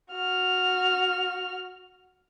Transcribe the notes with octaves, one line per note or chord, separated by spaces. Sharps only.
F#4 F6